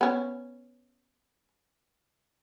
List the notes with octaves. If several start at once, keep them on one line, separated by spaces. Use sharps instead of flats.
B3 C#4